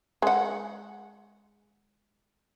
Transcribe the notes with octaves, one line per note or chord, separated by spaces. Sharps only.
G#3 F#5